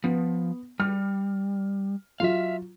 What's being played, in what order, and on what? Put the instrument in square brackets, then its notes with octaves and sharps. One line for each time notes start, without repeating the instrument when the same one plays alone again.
[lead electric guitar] F3 [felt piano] B3
[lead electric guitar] G3 [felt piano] F6
[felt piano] F#3 F4 [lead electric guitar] E5 F5